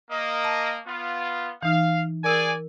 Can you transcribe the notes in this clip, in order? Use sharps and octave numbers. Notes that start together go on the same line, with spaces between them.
A#3 D#5
A5
B3 F4
E3 D#4 F5
G#4 A#4 D5 G#5 E6